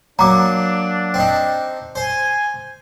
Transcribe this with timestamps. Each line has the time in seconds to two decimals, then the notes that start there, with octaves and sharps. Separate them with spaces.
0.19 F#3 A#3 D4 A#5 D6
1.14 C4 D#4
1.96 C5 G#5